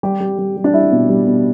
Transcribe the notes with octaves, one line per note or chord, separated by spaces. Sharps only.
G3 G4
G3
G3
G3
D4
G3 E4
B2
G3
B2